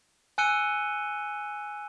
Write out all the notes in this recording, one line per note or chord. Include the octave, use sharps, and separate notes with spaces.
G#5 E6 F#6 C#7 D#7 G7